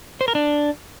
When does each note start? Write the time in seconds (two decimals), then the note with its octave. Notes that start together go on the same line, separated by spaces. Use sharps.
0.21 C5
0.28 A#4
0.35 D4